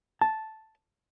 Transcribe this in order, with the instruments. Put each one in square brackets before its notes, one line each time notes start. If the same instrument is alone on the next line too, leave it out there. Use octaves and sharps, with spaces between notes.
[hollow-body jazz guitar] A5